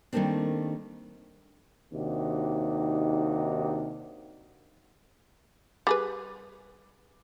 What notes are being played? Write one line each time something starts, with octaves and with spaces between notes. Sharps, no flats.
D#3 G3 A3 A#3 C4 D4
D#2 C3 D4 D#4 F#4
G3 G#4 B4